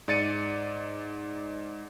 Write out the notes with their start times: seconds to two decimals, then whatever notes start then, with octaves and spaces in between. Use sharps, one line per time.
0.08 G#2 D5 A6 C#7 D#7